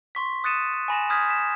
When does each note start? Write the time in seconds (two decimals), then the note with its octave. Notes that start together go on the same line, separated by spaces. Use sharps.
0.15 C6 C#6 B6
0.44 D#6 F#6 A6 C#7 D#7 E7
0.74 F#6
0.88 G#5 B5 A#6 E7
1.10 B5 D#6 F6 G6 G#6 B6
1.29 B6 E7